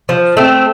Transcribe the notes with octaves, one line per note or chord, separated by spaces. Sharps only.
F3
A3 C4